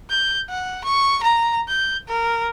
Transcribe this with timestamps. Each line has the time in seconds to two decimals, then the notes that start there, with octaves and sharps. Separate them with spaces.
0.10 G6
0.49 F#5
0.84 C#6
1.23 A#5
1.68 G6
2.08 A#4